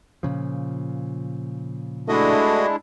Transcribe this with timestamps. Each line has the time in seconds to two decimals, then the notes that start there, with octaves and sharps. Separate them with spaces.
0.23 A#2 C#3 F3
2.08 G#3 A3 D4 E4 F#4 D#5